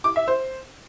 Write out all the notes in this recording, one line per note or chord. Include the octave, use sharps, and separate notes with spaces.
D6
E5
C5